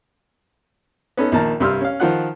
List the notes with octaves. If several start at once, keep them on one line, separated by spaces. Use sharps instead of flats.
B3 C#4 D#4 A4
A#1 D#3 A#3 A5 A#5
C2 G2 G4 C6 E6 F6
C#4 F5
D#3 F3 F4 F#5 F#6